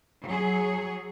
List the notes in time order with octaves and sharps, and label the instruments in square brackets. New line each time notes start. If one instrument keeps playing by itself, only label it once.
[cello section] F#3 G#4